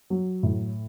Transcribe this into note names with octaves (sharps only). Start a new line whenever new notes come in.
F#3
A2